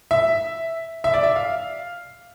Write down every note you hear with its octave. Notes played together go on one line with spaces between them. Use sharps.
E5
E5
D5
E5
F5